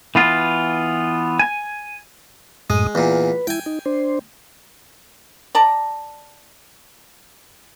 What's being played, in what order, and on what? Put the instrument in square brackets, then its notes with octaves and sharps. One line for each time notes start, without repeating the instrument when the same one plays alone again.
[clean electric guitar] E3 B3 F4
G#5
[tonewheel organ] F#2 A2 D#6 [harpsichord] G#3
[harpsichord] E2 A#2 [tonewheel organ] B4
[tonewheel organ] E4 [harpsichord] G5 G#5
[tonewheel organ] D#4
D4 C5
[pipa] D5 A5 A#5